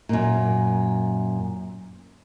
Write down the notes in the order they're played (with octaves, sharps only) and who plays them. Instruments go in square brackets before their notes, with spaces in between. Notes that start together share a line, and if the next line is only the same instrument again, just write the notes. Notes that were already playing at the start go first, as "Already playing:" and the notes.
[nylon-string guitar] F#2 A#2